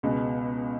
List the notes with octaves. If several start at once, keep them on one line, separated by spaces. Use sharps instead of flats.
C#2 B2 G#3 B3